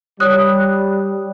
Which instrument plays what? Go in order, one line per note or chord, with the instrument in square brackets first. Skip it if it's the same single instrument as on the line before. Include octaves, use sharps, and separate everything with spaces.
[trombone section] G3 [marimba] C#5 D#6 F#6